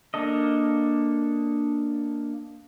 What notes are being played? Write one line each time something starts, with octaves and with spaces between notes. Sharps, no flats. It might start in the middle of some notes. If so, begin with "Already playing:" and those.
A#3 D4 A4 D#5